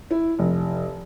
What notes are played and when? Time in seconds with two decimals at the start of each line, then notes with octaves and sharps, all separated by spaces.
0.11 E4
0.39 F1